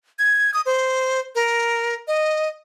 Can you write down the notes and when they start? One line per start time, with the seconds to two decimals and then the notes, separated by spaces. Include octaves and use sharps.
0.19 G#6
0.54 D#6
0.66 C5
1.35 A#4
2.08 D#5